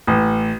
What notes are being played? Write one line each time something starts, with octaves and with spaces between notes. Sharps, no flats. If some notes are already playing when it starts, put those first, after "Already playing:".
A1